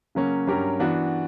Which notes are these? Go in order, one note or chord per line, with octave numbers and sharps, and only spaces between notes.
C#3 F#3 A#3 C#4
G2 F#3 C#4 G4 A#4
E3 B3 D4 F#4